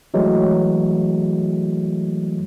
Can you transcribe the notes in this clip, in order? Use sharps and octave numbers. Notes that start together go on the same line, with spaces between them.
E3 F#3 G#3 A3